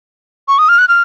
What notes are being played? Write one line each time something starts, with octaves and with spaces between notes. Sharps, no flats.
C#6
D#6
F6
F#6
F6